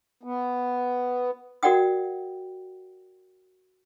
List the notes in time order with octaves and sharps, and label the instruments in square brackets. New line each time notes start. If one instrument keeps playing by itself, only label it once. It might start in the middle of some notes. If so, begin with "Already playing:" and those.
[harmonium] B3
[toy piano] F#4 A#4 D5 F#5 G5 D#6